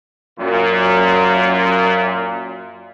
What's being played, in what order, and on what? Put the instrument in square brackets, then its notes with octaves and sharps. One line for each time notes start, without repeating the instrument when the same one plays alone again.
[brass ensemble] F#2 A#2